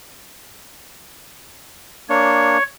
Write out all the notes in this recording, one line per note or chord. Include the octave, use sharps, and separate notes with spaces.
A#3 D4 C#5